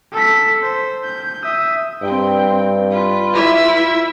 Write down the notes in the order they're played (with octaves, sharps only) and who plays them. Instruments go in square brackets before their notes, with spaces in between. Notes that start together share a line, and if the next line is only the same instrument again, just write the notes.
[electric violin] A4 B6
C5
G6
E5 D#6
[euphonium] G2 [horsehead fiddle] C4 G5
[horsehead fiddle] F4 B4
[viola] E4 E5